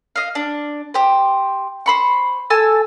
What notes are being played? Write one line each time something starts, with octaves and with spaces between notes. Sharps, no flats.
D#5 F5
D4
G4 C5
C5 B5 C#6
A4 G#5 A5 E6